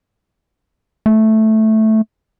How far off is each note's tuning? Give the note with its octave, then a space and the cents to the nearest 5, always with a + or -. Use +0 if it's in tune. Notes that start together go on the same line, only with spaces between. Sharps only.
A3 -5